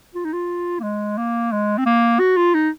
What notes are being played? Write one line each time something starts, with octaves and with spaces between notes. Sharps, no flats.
F4
D#4
F4
A#3
G#3
A#3
G#3
C4
A#3
F#4
F4
D#4